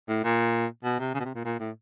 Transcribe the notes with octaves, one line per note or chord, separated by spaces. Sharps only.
A2
A#2
B2
C3
C#3
B2
C3
A#2
A#2
A2